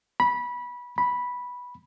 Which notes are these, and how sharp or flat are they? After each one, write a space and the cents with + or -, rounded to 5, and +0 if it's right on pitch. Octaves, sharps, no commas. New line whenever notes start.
B5 -20
B5 -10